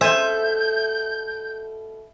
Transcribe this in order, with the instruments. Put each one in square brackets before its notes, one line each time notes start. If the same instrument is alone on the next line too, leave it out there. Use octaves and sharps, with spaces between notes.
[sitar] B2 A4 [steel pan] C5 G#5 [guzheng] E5 [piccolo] G6